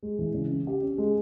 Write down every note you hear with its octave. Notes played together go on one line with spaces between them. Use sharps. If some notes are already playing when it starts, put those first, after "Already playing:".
G#3
E3
C#3
C#4
G4
C#4
G#3